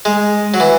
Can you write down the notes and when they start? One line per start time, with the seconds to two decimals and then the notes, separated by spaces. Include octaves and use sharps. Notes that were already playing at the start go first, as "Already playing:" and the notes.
0.05 G#3
0.54 F#3
0.60 E3